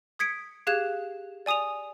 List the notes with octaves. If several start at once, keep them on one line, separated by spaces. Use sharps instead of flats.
D#6 G#6 B6 C#7 D7
G4 G#4 F5 F#6 G#6 E7
D5 G#5 D#6 D#7 F7